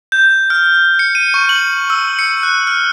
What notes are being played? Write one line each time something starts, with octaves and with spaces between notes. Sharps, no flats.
G6
F6
C#7
D#7
C#6
F#7
E6
C#7
F#6
F6